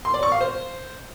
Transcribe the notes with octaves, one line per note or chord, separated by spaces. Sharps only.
C6
D5
C#6
F5
C5